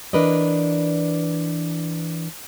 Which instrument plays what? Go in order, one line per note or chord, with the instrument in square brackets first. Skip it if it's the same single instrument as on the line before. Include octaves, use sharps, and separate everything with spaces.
[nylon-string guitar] E3 D4 A#4 B4 D5 D#5